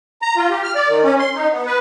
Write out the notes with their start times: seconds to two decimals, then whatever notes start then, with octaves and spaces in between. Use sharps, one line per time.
0.22 A#5
0.36 F4
0.50 G4
0.63 F6
0.75 D5
0.88 D#3
1.03 C#4
1.19 C6
1.35 D#4
1.52 B3
1.66 B4